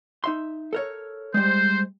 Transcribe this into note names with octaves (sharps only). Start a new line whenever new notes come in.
D#4 E5 C6
A4 A#4 C#5
G3 G#3 C5